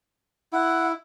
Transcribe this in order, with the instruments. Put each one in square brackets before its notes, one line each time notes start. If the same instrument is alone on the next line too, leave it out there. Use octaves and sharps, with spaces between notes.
[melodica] E4 [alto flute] F#5